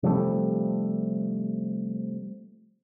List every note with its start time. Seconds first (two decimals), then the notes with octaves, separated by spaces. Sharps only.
0.03 C3 F3 G3 A3